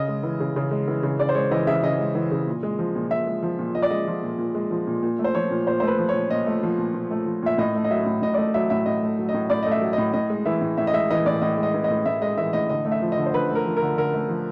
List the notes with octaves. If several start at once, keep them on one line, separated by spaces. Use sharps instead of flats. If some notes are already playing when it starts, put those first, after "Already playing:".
Already playing: C#3 D#5
G#3
E3
C#3
C#3
G#3
E3
C#3
C#3 D5
C5
G#3 C#5
E3 D#5
C#3 E5
C#3 D#5
G#3
E3
C#3
A#2
G#3
F3
A#2
A#2 E5
G#3
F3
A#2
A#2 D#5
D5
G#3 D#5
F3
A#2
A#2
G#3
F3
A#2
A#2
A3
C5
F3 C#5
A#2
A#2 C5
A3 C5
B4
F3
C#5
A#2
A#2 D#5
A3
F3
A#2
A#2
A3
F3
A#2 E5
A2 D#5
A3
D#5
F#3 E5
A2
A2 D#5
D5
A3 D#5
F#3 E5
A2 E5
A2 D#5
A3
F#3
D#5
A2
A2 D5
D#5
A3 E5
F#3
A2 D#5
A2 D#5
G#3
E3 E5
A2
A2 E5
D#5
G#3 E5
E3 D#5
A2 D5
A2 D#5
G#3
D#5
E3
D#5
A2
A2 E5
G#3 D#5
E3 E5
A2 D#5
D3 D#5
A3
E5
F3
D#5
D3
C5
D3 B4
A3
A#4
F3
A#4
D3
D3 A#4
A3
F3